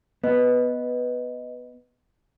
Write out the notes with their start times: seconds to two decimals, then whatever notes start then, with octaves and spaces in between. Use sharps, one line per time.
0.24 B3 B4 D#5